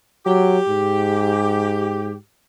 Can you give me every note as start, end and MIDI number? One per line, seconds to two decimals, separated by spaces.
0.26 0.59 54
0.26 2.14 67
0.68 2.15 44